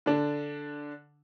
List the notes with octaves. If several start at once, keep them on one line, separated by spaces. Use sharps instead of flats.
D3 D4